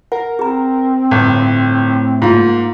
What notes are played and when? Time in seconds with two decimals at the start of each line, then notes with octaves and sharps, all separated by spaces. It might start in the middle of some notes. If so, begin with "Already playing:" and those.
0.12 A#4 F#5
0.39 C4 G#4 A#5
1.11 G1 A2
2.22 G#2 A#3 F4 F5